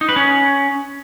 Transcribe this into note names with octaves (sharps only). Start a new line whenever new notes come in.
D#4
B4
C#4